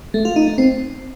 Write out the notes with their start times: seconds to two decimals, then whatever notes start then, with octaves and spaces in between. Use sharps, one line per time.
0.14 A3
0.25 F4
0.36 D#4
0.47 A3
0.58 C4